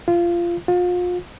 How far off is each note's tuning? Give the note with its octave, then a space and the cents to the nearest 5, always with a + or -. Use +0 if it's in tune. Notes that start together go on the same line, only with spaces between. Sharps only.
F4 -20
F4 +35